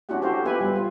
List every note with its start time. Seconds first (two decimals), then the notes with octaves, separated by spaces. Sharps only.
0.09 C#4 D4 E4 F#4 G4 F#5
0.22 F#4 G4 A4 C5 F5
0.45 B3 F4 G4 B4 E5 G#5
0.61 G3
0.76 F4